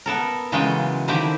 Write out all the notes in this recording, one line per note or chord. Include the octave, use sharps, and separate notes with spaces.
B3 A4 A#4
C#3 E3 F#3 G#3 F4 G5
D3 D#3 F3 C4 E4 G4